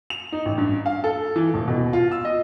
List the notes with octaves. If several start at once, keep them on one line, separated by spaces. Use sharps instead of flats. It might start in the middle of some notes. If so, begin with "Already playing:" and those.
F7
D#4
A1
G2
F5
A4
E3
D#1
B2
F4
E6
D#5